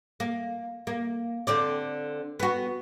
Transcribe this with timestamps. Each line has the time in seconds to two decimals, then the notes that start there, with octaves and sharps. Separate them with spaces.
0.20 A#3
0.87 A#3
1.47 D3 C4 D5
2.40 B3 F#4